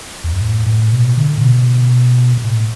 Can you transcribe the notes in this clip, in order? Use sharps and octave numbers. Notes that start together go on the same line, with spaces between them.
E2
F#2
A2
A2
B2
D3
A2
B2
B2
A2